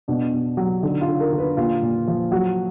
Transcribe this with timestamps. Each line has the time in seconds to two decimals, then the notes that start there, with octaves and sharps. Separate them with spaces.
0.08 B2 D4
0.33 B2
0.57 F#3
0.83 D3 D#4
1.01 F4
1.07 D3
1.20 A#4
1.33 D3
1.38 B4
1.57 A#2 F4
1.82 A#2
2.08 F3
2.31 F#3 F#4